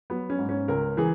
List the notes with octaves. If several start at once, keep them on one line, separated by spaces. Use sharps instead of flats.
F#3 B3
C#4
G#2
C#4
C#2 A#4
E3 G#4